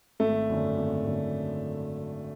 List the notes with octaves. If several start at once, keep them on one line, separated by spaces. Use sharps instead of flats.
G#1 A3
F#2 D3
G#1
F#2 D3